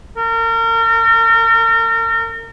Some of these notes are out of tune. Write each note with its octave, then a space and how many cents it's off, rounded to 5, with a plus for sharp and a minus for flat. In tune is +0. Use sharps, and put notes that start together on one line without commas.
A#4 -35